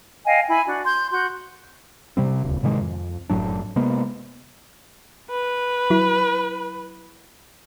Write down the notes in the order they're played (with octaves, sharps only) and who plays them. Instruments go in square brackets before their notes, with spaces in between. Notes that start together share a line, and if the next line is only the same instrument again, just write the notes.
[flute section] D#5 F5 G5 G#5
E4 G#5 B5
D4 F#4
C6 G6
F#4 C6 G6
[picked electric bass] C3 G3 C4
D#1 C#2
A2 C3 D#3 G#3
F2
F#1 A2 F#3 D4
C3 G#3 A#3 B3
[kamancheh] B4
[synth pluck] F#3 E4